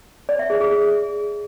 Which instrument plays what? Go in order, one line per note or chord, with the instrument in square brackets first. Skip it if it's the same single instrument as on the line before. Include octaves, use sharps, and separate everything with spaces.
[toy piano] D5
E5
G#4
G#4